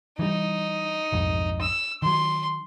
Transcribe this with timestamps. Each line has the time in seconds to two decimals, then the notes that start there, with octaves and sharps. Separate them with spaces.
0.19 E3 G3 D#4
1.12 B1 F2 G#2
1.61 E6
2.02 D#3 F#3 C6